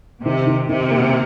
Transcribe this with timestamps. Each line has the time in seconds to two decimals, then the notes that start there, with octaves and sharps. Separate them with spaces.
0.25 C3 D#3
0.47 D#3
0.69 C3 D#3
0.91 A#3